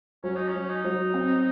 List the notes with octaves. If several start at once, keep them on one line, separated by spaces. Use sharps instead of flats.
F#3 C#4
D#4
C#4
F#3
D#4
F#3
C4